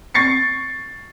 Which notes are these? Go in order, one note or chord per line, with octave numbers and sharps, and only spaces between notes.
C#6 A6 C7 C#7